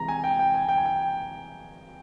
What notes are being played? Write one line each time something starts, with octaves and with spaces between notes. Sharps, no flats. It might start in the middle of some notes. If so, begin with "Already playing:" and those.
Already playing: C3 E3 G#3 A#5
G#5
G5
G5
G#5
G5
G#5
G5